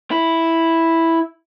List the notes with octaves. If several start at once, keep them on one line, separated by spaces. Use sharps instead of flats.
E4